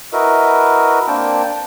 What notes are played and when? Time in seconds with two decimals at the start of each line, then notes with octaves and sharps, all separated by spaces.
0.13 E4 F#4 A#4 B4 D#5 E5
1.08 A#3 C4 D4 G5 A5